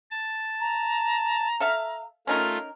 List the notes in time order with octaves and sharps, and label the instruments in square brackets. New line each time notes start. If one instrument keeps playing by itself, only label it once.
[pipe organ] A5
[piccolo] A#5
[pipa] A4 E5 F5
[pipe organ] A3 F4 [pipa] C#4 D#4 A#4